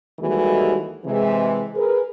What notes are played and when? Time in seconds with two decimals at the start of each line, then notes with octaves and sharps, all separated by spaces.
0.19 D#2 E3 G3 G#3 F#4 A4
1.04 C3 E3 G#3
1.74 G#4 A#4 B4